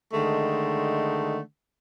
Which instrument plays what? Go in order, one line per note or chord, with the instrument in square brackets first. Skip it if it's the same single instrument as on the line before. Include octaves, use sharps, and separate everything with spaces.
[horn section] D3 D#3 G#3 A3